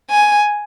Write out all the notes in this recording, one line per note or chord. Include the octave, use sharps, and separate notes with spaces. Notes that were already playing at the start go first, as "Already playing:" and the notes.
G#5